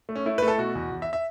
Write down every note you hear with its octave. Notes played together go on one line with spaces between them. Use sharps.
A3
C#4
A3 E4
A3 B4
A4
B2 F#4
E2
E2
E5
E5